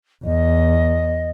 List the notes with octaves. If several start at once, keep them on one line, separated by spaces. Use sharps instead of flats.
E2 D#5